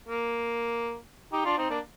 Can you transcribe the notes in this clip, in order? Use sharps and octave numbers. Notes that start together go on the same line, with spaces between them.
A#3
D#4 G4
D4 F4
C4 D#4
A#3 D4